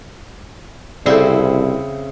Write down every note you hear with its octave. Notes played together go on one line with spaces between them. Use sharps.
C2 C#3 C4 E4 A4 D5